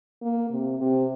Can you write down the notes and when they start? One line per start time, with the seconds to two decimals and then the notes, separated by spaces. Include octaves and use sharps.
0.22 A#3
0.51 C3
0.79 C3